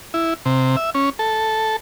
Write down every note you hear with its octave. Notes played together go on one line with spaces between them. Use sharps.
E4
C3
E5
C#4
A4